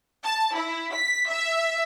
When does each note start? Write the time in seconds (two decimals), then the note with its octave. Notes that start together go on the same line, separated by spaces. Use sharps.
0.25 A5
0.55 E4
0.94 B6
1.31 E5